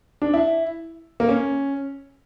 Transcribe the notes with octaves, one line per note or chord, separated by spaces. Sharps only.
D4
E4
A#3
C#4